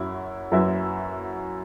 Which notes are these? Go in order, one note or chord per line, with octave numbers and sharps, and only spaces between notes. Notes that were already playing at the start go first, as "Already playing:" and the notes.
Already playing: F#2 F#3 E4
F#2 F#3 E4 B4 E5